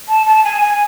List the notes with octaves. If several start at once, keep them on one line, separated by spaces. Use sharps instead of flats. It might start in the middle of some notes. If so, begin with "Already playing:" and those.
A5
A5
G#5
G#5